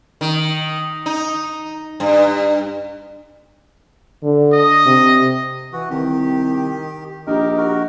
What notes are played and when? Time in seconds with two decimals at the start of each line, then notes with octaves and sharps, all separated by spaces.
0.21 D#3
1.06 D#4
2.00 G2
4.23 D3
4.53 D#5
4.86 C3
5.73 E3 F#4
5.90 C2 D#3 G4
7.27 A#1 D#4 G4 A#4
7.57 F#4 A#4